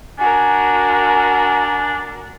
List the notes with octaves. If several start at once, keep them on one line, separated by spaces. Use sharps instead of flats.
D4 F#4 A#4 G#5